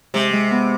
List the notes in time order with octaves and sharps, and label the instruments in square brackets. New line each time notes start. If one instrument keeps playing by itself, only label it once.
[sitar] C3 [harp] G#3
[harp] G#3
B3